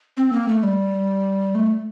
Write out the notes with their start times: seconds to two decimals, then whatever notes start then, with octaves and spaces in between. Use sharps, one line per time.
0.17 C4
0.33 A#3
0.48 A3
0.63 G3
1.55 A3